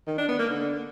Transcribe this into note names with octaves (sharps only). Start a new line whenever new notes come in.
D#3
D4
B3
A#3
D3